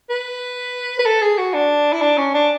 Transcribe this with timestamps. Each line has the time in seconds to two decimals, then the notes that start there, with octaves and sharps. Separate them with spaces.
0.10 B4
0.99 B4
1.05 A4
1.22 G#4
1.38 F#4
1.54 D4
1.92 E4
2.01 D4
2.17 C#4
2.34 D4